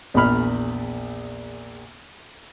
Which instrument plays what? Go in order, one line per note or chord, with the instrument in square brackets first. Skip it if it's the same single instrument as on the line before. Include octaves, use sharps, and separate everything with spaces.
[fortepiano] A#1 E2 A#2 B5 F6